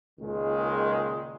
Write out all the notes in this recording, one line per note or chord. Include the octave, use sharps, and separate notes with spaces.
C#2 A#2 D#3 G#3